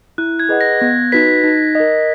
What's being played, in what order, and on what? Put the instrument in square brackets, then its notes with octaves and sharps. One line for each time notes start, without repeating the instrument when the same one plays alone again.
[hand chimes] E4 [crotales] F#6
[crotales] G#6
[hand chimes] G#4 B4 D#5 F#5
[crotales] A#6
[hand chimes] B3 [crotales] A#6
[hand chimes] D#4 F#4 B4 [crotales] B6
[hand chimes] D#4
A#4 D#5